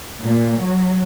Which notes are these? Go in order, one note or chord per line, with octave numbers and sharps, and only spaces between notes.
A#2
F#3